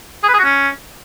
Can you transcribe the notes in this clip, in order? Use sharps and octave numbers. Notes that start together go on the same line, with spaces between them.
G#4
B4
G#4
F#4
C#4